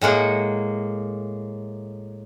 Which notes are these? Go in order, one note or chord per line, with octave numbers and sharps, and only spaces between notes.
A2 G#3 A#3 F#5